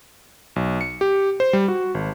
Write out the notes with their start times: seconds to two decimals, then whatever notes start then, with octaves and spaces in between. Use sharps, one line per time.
0.56 B1
0.81 C#7
1.01 G4
1.40 C5
1.53 G3
1.68 F#4
1.95 G#1